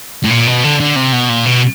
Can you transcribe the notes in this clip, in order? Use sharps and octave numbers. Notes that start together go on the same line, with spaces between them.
A2
A#2
B2
D3
D3
C3
B2
A#2
B2